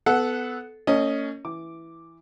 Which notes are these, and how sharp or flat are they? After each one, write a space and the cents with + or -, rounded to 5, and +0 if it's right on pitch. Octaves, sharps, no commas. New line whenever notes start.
B3 +15 A4 -15 F#5 +0
A#3 -45 C#4 +10 D#5 +0
E3 +0 D6 +0